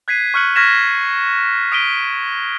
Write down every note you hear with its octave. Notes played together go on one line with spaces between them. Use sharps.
F#6 G#6 B6 C7 D#7
C#6 F6 F#6 C#7 F#7
C#6 F6 G#6 A#6 B6 E7
D#6 B6 D7 D#7 G7